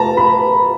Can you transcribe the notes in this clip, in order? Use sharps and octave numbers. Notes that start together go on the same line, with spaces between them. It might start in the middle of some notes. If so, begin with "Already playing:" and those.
Already playing: A5 A#5
B5